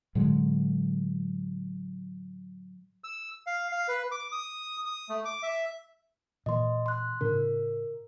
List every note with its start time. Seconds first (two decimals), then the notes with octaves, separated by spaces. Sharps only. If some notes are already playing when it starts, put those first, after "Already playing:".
0.15 A2 D3 F#3 G#3
3.04 E6
3.46 F5
3.72 F5
3.88 B4
4.12 D6
4.32 D#6
4.86 D#6
5.09 A3
5.25 D6
5.43 E5
6.46 A#2 E3 D#5 C6
6.86 C6 F#6
7.21 A2 C#3 D4 A#4